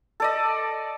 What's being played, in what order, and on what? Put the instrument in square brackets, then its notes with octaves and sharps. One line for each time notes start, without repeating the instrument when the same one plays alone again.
[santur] A4 D5 D#5